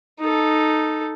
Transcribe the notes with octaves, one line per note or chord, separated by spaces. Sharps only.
D#4 A4